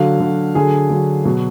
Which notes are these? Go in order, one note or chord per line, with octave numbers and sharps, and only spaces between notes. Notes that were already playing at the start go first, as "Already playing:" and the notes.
Already playing: D3 F#3 F5
D3 F#3
D3 F#3 G#4
D3 F#3
B2 F#3